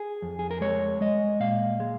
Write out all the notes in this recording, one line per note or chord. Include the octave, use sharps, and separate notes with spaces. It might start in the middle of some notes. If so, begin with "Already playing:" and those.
Already playing: G#4
F2
G#4
A#4
G#3 C#5
G#3 D#5
A#2 F5
G#3